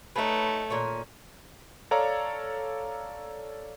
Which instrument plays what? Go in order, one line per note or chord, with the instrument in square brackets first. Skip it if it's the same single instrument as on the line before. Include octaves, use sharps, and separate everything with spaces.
[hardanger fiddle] A3 C#5 [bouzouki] D#4 B4
[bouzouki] A#2 D#3 C#4
[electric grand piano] A4 C#5 D5 F5 A#5